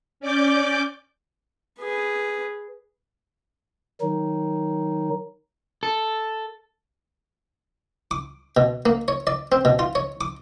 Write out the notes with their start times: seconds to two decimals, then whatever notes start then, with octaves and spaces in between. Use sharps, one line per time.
0.20 C#4 D5 D6 G6
1.80 G#4 B4
4.01 D#3 F#3 D#4
5.83 A4
8.11 D6
8.57 B2
8.86 A#3
9.08 C#5
9.27 D5
9.52 C4
9.65 B2
9.79 F4
9.95 C#5
10.21 D6